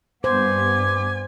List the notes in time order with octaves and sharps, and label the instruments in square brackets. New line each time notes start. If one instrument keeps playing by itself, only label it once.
[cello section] G2 B3 [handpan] C5 [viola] G#5 [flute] D6